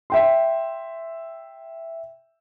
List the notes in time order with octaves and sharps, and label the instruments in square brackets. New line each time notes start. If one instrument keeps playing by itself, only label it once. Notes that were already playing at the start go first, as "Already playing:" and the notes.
[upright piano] E5 G5 C6